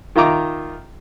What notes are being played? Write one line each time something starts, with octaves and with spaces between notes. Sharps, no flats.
D#3 F4 E5 A#5 D6